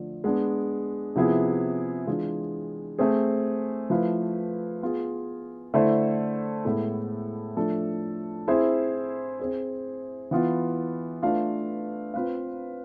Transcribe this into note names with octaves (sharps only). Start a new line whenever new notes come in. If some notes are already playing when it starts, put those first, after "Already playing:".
Already playing: D3 F3 A3
G#3 B3 D4
C3 F3 B3 E4 G#4
E3 G#3 D4 F4
A3 C4 G#4
F3 A3 E4 B4 F5
B3 F4 G#4
D3 A3 E4 A4 C5
A2 G#3 B3 E4 A4
F3 A3 D4 A4
C4 E4 G#4 C5 E5
C4 G#4 C5
E3 B3 F4
A3 D4 F4 B4 F5
C4 F4 B4 F5